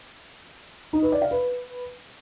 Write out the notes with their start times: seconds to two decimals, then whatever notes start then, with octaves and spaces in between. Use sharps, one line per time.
0.93 D#4
1.03 B4
1.12 D5
1.22 F5
1.31 B4